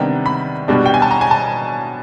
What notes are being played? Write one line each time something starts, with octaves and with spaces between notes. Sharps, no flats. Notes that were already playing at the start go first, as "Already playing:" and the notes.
Already playing: C3 D#3 G3 B3 D4 A#5
B5
B2 G3 B3 D4
G5
G#5
A5
A#5
G#5
A5